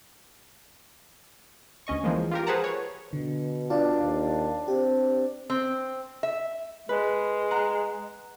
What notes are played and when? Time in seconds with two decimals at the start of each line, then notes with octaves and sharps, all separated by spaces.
1.87 D2 C#4 D#5 C#6
2.04 E3 F3 G#3 A#3
2.31 F4 G4 A#4
2.47 G#4 B4 C5 F#5 A5 A#5
2.64 C#5
3.13 B2 D3
3.70 D4 F4 F5
4.00 D#2 D5
4.68 C4 G4
5.50 C4
6.23 E5
6.89 G#3 B4
7.51 F#5 A#5